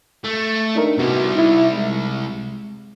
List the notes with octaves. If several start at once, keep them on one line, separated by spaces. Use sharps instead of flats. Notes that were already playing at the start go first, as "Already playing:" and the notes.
A3
D4 D#4 A#4
C2 C3 B3 F#4
D#4 E4
G#3